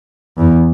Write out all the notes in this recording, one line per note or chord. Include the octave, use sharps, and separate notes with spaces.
E2